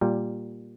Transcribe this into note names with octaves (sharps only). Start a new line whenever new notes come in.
A#2 G3 A#3